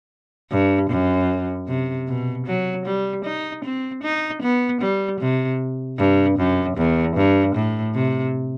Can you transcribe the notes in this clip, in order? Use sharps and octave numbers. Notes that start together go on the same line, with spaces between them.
G2
F#2
C3
B2
F#3
G3
D#4
C4
D#4
B3
G3
C3
G2
F#2
E2
G2
A2
C3